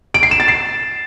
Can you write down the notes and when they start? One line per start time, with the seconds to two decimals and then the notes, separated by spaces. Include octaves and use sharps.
0.14 D7
0.23 C7
0.31 E7
0.40 A6
0.48 C7